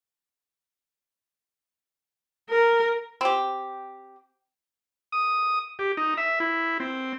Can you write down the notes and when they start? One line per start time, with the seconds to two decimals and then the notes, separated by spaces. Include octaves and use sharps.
2.50 A#4
3.21 C4 G4
5.12 D#6
5.79 G4
5.97 D#4
6.17 E5
6.40 E4
6.80 C4